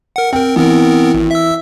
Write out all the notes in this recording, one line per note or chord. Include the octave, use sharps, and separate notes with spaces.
A#4 F#5
C4 A#4 G5
E3 B3 C4 A#4
G#1
E5 E6